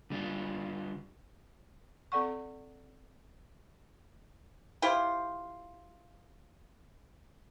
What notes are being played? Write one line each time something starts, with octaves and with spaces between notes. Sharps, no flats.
D3 G3 D4 F4
C4 A4 D5 F#5 C#6
E4 F4 G4 C5